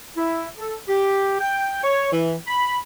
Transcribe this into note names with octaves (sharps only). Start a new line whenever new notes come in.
E4
A4
G4
G5
C#5
E3
B5